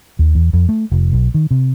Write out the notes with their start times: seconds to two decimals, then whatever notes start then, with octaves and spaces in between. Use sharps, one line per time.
0.19 D#2
0.35 E2
0.53 F2
0.69 A3
0.92 F1
1.13 B1
1.34 D#3
1.51 C3